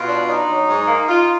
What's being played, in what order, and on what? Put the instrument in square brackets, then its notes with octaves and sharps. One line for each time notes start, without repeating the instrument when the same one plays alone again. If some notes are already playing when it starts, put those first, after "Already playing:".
Already playing: [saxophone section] B2 [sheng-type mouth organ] F4
[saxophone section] D4
[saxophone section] D4 [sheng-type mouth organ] D#4
[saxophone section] F#3
G#2
A#3
[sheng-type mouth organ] D#4 [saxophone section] F4